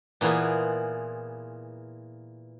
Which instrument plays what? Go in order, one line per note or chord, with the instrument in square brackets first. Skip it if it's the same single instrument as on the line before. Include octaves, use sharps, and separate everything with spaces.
[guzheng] A#2 E3 B3 F4 G#4